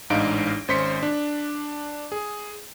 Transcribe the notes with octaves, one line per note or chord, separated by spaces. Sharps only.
A1 G#2 D4 D#4 F5 D7
G#1 C#4 C5 C6 B6 C#7
D4
G#4